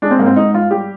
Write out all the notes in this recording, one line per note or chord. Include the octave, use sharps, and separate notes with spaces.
G#3 D4
C4
G#2 A#3
C4
G#2 D#4
F3 F4
G3 G4